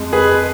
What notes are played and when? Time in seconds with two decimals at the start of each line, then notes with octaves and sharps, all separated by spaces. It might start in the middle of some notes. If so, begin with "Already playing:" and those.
Already playing: F2 G#3
0.13 G#4 B4